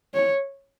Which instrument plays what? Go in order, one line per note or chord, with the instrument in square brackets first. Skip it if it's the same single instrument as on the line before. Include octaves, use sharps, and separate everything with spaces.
[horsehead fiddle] C#5